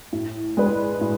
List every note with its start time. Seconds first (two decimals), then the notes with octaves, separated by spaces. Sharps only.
0.13 A2
0.57 G#3 D4 G#4 B4
1.01 A2